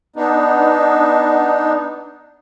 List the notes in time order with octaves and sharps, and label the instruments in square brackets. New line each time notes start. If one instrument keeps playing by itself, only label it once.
[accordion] B3 D4 D#4